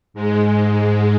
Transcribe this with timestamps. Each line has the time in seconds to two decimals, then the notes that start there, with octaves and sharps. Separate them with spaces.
0.14 G#2 G#3